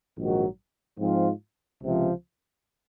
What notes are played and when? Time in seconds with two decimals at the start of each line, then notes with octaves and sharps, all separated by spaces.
0.16 A#1 G#2 D#3 F#3
0.99 G#2 F3 C4 F4
1.82 C#2 C3 F3